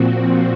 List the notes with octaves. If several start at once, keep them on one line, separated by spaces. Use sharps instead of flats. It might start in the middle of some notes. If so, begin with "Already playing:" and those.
Already playing: A#2 F3 C4 F#4